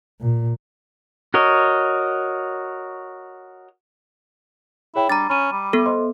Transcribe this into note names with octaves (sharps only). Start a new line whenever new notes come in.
A#2
F#4 A#4 C#5 D#5
E4 G#4 C#5 G5
G3 D4 A#5 A6
C#4 B5 D#7
G3
B3 A4
C5 D#5 C6